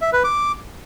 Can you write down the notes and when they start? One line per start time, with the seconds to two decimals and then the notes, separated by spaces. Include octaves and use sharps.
0.01 E5
0.13 B4
0.24 D6